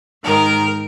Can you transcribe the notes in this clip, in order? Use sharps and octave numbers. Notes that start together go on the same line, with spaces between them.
G#2 D#3 A#4